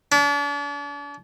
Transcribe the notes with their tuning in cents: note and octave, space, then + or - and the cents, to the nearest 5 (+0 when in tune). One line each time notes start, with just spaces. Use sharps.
D4 -40